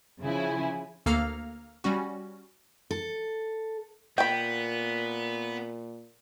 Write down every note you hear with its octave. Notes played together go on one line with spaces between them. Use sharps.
C#3 F3 E4 G#5
D2 A#3 A4 F5 A#5 F6
G3 C#4 F#4
A4
A#2 B3 G5 B5